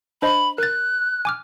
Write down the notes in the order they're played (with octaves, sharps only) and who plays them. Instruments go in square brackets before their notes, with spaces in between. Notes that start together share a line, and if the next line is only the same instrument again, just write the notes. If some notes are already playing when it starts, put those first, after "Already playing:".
[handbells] D4 C5 D#5 [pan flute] B5
[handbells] A#4 A6 [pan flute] F#6
[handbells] G#5 D6 F6